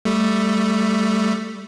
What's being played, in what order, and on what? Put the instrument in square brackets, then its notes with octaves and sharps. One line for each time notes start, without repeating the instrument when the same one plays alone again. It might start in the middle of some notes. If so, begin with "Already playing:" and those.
[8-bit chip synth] G3 A3